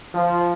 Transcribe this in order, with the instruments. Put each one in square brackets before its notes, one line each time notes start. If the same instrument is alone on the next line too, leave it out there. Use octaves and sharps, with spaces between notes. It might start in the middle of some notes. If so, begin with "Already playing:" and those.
[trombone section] F3